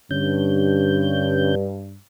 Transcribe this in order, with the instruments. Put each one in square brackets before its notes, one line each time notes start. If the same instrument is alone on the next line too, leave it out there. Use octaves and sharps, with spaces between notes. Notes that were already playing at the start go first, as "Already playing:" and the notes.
[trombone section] G2 [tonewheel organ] D3 C#4 G6